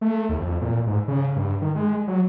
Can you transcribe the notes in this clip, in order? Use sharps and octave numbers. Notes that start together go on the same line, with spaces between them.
A3
D#2
F2
A#2
G#2
C#3
G2
D#3
G#3
F#3